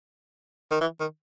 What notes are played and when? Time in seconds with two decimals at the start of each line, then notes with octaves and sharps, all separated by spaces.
0.72 D#3
0.81 E3
1.00 D#3